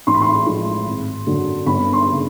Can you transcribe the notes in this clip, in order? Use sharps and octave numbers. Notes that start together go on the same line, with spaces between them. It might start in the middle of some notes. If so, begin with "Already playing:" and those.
A1 C6
B5
C6
A2 F3 G#3
G#1
F#2 D3 F#3
G1 B5
C6
C#3